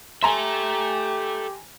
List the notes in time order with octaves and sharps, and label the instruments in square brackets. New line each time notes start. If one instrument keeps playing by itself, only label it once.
[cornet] G4 [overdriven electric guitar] A4 E5 [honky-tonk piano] G#5 A#5 C6